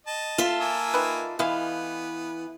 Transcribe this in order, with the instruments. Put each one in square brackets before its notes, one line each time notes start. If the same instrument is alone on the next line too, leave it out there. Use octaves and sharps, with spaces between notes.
[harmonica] D#5 A5
[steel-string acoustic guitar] F4 A4 E5
[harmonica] A#3 G#5 E6
[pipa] D#3 B4
[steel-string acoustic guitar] E3 [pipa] G#3 E4 F5 [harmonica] B3